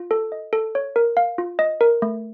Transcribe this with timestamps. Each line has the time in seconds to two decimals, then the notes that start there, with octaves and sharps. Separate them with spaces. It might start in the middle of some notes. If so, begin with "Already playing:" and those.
Already playing: F4
0.11 A4
0.32 D#5
0.53 A4
0.75 C#5
0.96 A#4
1.17 F5
1.38 F4
1.59 D#5
1.81 A#4
2.02 A3